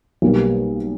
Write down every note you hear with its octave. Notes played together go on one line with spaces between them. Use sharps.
B1 B2 G3 A#3